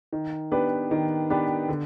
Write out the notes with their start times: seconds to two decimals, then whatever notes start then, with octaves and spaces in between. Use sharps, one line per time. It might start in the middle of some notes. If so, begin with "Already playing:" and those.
0.13 D#3
0.52 B3 D4 G4 B4
0.91 D#3
1.30 B3 D4 G4 B4
1.69 D3